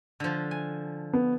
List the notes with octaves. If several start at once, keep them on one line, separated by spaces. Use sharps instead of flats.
D3 F3
G#5
B3